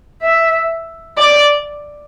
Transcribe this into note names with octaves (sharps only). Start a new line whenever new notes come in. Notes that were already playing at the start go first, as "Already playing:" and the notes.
E5
D5